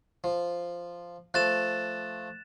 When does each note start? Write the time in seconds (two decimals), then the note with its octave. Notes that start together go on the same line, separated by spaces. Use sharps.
0.24 F3
1.34 F3 A3 F#6 A6 E7